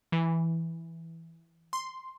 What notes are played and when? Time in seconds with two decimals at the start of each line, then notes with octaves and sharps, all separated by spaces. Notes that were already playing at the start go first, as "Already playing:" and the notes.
0.12 E3
1.73 C6